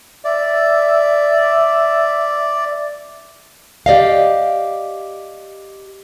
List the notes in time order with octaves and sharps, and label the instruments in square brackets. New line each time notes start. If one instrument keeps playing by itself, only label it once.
[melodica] D5 [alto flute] E5
[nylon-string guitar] G4 D5 D#5 F5